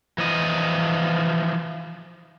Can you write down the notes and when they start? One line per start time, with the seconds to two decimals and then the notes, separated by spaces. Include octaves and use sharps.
0.18 E3 F3 D#5